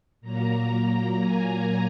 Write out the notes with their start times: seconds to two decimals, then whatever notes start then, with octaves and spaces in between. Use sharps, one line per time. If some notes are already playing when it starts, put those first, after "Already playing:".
0.21 A#2 F#3 A#3 A#5
1.19 G#5